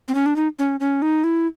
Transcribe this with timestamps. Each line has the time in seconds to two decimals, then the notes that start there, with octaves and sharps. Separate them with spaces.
0.08 C4
0.15 C#4
0.26 D4
0.36 D#4
0.59 C#4
0.80 C#4
1.02 D#4
1.24 E4